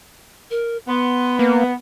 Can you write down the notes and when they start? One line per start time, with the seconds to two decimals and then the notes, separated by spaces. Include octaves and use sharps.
0.51 A#4
0.88 B3 C6
1.39 A#3 B4